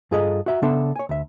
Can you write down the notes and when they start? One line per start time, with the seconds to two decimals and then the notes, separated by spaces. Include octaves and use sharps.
0.11 G2 F4 G#4 A4 D#5 A#5
0.46 F#4 E5 A#5
0.62 C#3 B3 D4 A4 E5 C6
0.96 C#5 G#5
1.09 D2 E5